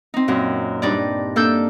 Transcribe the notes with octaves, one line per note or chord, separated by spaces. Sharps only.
C4 D#4
F#2 A#2
G2 D4 D#4 D5
A#3 D4 A4 E6 G6